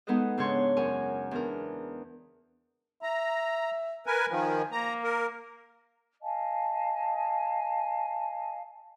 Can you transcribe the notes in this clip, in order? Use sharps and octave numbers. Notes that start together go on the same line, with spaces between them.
G#3 B3 D#4 A4 B4 D#5
G#2 C#3 G#3 D4 C#5 C6
F#2 A#4 G#5 C#6
E2 D4 A#4
E5 A#5
A#4 B4 G#5
D#3 F3 G#5
A#3 A#5
A#4
D#5 F5 G#5 A5